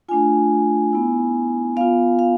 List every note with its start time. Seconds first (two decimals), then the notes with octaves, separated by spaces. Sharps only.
0.09 A3 D4 F4 G#5
0.93 B3 E4
1.76 B3 F4 F5
2.19 F5